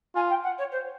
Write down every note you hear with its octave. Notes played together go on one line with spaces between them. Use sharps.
F4 G#5
G5
F#5
C#5
C5